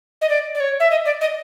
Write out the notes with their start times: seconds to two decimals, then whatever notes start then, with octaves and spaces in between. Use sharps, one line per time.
0.22 D#5
0.29 D5
0.55 D5
0.60 C#5
0.80 E5
0.91 D#5
1.06 D5
1.21 D#5